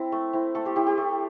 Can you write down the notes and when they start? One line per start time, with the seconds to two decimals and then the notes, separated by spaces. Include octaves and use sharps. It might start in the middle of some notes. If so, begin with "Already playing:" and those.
Already playing: C4 E4
0.12 A3
0.33 C4 E4
0.55 A3 A4
0.65 G4 C5
0.76 E4 G4
0.87 G4 C5
0.98 A3